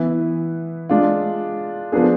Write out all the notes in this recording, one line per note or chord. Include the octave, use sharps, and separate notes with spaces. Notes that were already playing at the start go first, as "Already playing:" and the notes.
Already playing: E3 B3 E4 B4
G#3 D4 F4
F3 B3 D4 G#4